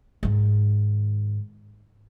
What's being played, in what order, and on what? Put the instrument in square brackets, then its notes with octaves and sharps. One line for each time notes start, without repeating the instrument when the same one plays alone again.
[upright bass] G#2 D#3